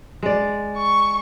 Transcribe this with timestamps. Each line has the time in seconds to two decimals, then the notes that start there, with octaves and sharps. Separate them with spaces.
0.23 G#3 D5
0.77 C#6